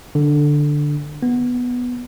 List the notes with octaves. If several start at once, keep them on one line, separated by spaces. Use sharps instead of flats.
D3
B3